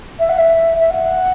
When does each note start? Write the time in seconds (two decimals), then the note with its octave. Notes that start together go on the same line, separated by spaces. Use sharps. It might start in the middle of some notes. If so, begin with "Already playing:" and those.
0.19 E5
0.29 F#5
0.38 E5
0.80 E5
0.90 F#5